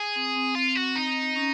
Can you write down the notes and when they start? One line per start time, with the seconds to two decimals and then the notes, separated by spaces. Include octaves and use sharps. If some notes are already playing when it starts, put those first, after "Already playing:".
Already playing: G#4
0.16 C4
0.36 C4
0.55 C4 F4
0.76 F#4
0.96 D#4
1.36 C#4